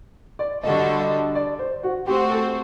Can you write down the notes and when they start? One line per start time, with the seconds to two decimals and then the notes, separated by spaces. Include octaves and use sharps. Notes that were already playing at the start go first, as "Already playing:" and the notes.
0.39 D5
0.63 D3 G3 D4 F#4 A4 D#5
1.00 D#5
1.35 D5
1.59 C5
1.83 F#4
2.06 A3 C4 F#4 G4 C5
2.30 A4